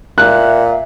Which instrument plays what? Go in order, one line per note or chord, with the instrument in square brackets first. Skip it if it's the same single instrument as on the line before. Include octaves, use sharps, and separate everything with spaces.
[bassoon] A#2 [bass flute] E5 [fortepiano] F#6